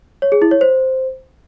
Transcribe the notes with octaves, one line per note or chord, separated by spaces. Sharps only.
C#5
G#4
E4
C#5
C5